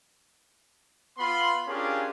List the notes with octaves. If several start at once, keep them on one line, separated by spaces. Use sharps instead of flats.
B3 F4 B5 C6
C#4 D4 F4 G4 G#4 A#4